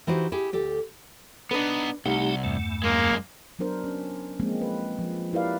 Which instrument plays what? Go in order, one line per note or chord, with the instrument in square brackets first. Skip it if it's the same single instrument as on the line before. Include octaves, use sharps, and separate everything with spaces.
[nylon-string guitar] E3 D#4 E4 F#4 G4 C5
E4 G4 G#4
D2 G4 A4
[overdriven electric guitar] B3 D#4 [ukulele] D4 B4
[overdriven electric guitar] C2 [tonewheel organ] A3 D#4 G4 [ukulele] F#5
[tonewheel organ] E2 G2 A3
[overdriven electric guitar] F#2 G#3 [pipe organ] A#3
[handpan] F#3 B3 D4 A#4 C5
C#4
F3 G#3 A#3 C4
B4
F3
E4 G4 A#4 B4 D5 F5